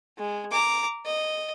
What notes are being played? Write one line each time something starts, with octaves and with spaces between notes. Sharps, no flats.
G#3
A#5 D6
D#5